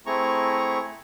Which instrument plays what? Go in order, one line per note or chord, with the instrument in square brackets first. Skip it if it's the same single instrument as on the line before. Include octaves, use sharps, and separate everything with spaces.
[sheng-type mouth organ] A3 C4 E4 G#4 A#5 C#6